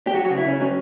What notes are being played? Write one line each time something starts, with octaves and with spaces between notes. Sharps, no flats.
G4
F#3 F#4
F#4
C#3
E4
C#3 C#4
F#3 C#4